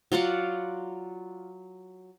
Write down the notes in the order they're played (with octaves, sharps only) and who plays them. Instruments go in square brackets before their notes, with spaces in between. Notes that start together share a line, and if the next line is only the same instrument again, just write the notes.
[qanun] F#3 F4 D5 F#5